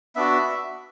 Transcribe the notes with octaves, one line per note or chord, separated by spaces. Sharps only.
B3 D4 F#4 E5